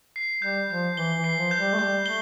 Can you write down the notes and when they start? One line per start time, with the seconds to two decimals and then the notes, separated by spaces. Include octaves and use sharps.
0.16 C7
0.42 G3 G6
0.70 F3 G6
0.97 E3 G7
1.17 E3
1.24 C7
1.38 F3
1.51 G6
1.58 G3
1.74 A3
1.79 G3 G6
2.06 A3 G7